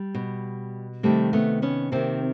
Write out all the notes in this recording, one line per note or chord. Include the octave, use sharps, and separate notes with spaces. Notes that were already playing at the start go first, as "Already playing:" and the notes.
Already playing: G3
B2
C3 D#3 G3 A3
A3 B3
B3 C#4
C3 D#3 A#3 C4